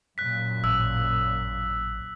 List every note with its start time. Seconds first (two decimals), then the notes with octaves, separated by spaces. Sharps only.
0.18 F#2 A#2 F#6 B6
0.64 A1 E6